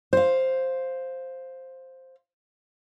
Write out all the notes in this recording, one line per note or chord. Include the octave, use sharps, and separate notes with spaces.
C5 F5